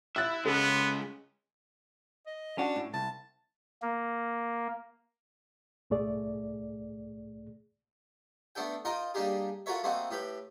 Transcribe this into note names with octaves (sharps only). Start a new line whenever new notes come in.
E4 E5 F#6 A6
C#3 G#3 B3 C#4 A4
D#5
C#4 D4 F#4
A2
C2 A5
A#3
C2 A2 A3 G#4 D5
A3 B3 D4 A4 G5
D#4 F4 A#4 D#5 G5
G3 A#3 D4 D#4 G4 G#4
F4 F#4 A4 A#4 C#5 E5
A3 A#3 C4 D#4 F#4
A2 G4 B4 G5